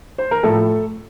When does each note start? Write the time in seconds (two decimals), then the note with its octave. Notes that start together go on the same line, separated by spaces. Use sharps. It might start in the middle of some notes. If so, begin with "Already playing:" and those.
0.18 C5
0.31 A#4
0.43 A2 F3 A3 A4